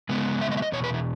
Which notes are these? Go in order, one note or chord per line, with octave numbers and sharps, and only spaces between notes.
C#3 G#3 B3
E5
D#5
E5
D#5
E2 B2 C#5
B4
E4